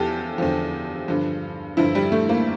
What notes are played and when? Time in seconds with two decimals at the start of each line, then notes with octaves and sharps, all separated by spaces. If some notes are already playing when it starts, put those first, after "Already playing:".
Already playing: E2 F3 G4 A4
0.38 E2 D3 F3
1.08 G2 D3 F3
1.77 G2 D3 F3 E4
1.95 G3
2.12 A3
2.29 A#3